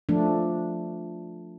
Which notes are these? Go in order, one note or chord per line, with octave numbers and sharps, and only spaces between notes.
F3 A3 D4